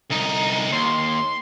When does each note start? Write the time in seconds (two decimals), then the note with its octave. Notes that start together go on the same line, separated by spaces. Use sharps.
0.11 C2 D#4
0.72 D#2 C6